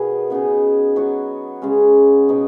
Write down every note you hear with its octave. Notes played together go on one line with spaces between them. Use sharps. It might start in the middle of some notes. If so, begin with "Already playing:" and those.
Already playing: B2 D#3 B3 G#4
C#3 B3 D#4 G#4
F#3 B3 F#4
C#3 G#3 C#4
B2 B3 D#4